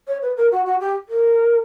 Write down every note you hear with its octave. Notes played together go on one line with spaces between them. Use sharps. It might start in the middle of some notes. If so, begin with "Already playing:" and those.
C#5
B4
A#4
F#4
F#4
G4
A#4